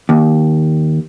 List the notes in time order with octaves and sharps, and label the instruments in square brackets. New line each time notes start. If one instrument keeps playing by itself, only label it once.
[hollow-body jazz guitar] D#2